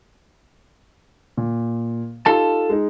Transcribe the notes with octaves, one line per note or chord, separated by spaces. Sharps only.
A#2
D#4 F4 G4 A4 A5
G#3 D#4